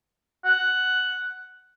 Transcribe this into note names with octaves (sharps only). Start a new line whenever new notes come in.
F#5